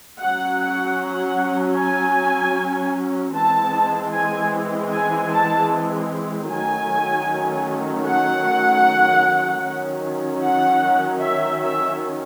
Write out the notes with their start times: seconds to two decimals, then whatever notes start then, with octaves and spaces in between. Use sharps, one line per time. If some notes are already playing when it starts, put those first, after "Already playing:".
0.21 F#3 C#4 F#5
0.60 F#5
1.00 F#5
1.78 G#5
3.36 E3 G#3 C4 A5
4.14 G#5
4.93 G#5
5.32 A5
6.50 D#3 F#3 A3 C#4 G#5
8.08 F#5
9.65 D#3 F#3 C#4
10.43 F#5
11.23 E5
11.62 E5